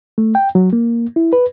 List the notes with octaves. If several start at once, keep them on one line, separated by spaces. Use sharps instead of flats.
A3
G5
F#3
A#3
E4
B4